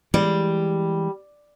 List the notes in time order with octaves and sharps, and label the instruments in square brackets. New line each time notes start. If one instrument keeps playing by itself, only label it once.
[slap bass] E3 G#3 [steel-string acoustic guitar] G3